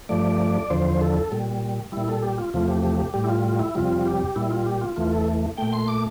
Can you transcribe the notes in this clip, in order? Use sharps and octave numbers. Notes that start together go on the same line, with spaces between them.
G2 F3 A3 D5
E2 D3 F3 C5
A4
A#2 G3
A#2 G3 E4
A4
G4
F4
E2 C3 F3 A3 F4
G4
G4
G4
A2 G3 G4
E4
F4
F4
E4
F2 C3 G3 F4
G4
A#2 G3 E4
F4
G4
F4
E2 E3 A3 F4
A4
A#2 A3 G5
C6
D6